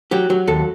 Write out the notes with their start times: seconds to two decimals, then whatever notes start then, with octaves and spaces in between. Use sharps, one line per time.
0.11 F#3 G4
0.30 F#3
0.48 D#2 A4